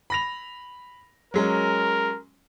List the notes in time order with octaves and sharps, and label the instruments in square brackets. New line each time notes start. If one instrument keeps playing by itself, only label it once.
[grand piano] B5 A#6 F7
[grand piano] F#3 G#3 C#4 [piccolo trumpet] A#4